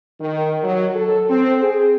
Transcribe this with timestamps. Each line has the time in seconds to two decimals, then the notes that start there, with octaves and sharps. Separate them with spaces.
0.21 D#3
0.64 F#3
0.95 A4
1.30 C4
1.62 G#4